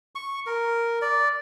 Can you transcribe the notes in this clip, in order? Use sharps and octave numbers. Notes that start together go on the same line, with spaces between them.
C#6
A#4
D5